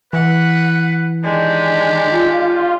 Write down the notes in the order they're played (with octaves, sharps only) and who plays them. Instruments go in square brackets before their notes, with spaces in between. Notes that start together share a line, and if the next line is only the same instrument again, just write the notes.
[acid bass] E3 [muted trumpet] B4 [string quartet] F#5
[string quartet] D#3 G#3 D4 [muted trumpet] G4
[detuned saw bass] F4